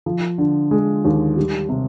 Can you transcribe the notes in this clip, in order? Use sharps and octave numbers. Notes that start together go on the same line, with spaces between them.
F3
D3
G#3
D#2
G3
C3